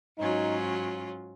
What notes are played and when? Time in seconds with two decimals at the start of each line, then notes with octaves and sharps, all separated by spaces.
0.18 G#2 F#3 C#4 D#4 F4